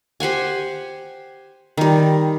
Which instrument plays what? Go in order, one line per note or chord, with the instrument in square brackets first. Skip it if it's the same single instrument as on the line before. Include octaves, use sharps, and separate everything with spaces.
[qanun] G4 C5 F#5 G#5
D#3 G3